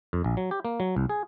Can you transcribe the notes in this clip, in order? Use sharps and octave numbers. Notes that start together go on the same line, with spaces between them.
F2
A#1
F#3
G4
A#3
F#3
C2
G#4